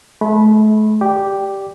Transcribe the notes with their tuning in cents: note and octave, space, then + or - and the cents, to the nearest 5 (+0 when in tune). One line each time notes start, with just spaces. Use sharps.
A3 -40 B5 -10
G4 +0 D5 +0